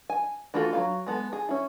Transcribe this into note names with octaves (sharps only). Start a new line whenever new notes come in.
G#5
E3 A3 F4 F#4 A4
F#3 E4 F5
G#3 B3 A4
G#4
C#4 E4